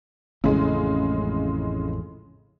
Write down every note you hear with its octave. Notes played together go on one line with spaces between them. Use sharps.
A1 F2 A2 C#3 G#3